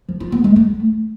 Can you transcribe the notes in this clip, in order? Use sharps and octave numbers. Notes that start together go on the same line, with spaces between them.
F3
F4
B3
G#3
A3